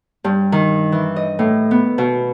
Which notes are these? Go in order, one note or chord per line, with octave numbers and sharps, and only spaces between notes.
G2
D#3
E3
D#5
A2
B3
B2